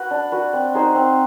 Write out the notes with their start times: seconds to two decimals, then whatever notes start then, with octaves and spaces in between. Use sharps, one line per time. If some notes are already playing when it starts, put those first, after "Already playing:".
Already playing: F#4 B4
0.11 D4
0.32 F#4 B4
0.53 C4
0.74 D#4 G#4 C5
0.95 C4